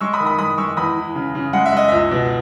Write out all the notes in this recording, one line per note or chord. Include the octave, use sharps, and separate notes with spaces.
G#3 C#6 E6
B5 D#6
D#3
B5 D#6
G#3 B5 D#6
G#3 C#6 E6
E2 B5 D#6
E3
C#3
C#3
G#3 F#5
E5
G#3 D#5
C#2 E5
B2